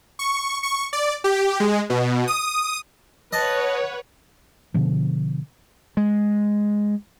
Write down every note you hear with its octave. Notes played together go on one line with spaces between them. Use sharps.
C#6
C#6
D5
G4
G#3
B2
D#6
B4 C#5 D#5 F#5 A5
B2 D3 F3
G#3